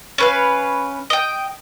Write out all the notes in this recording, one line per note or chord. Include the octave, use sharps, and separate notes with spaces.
C#4 B4 F5
D#5 G5